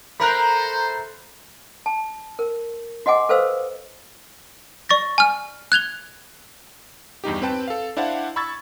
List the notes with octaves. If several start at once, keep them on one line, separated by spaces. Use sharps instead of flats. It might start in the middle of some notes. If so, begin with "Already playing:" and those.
A3 A#4 C5 A#5 B5 F#6
A5
A#4
F#4 D#5 F#5 G#5 D6
A4 B4 C5 F5 E6
D5 C#6 A6 A#6
G#5 F6
F#6 G#6 F7 G7
E2 G2 D#4 G4
C4 B4 G5 A5
A4 F5
D4 E4 C5 F5 F#5 A5
B5 C#6 E6 G#6 A6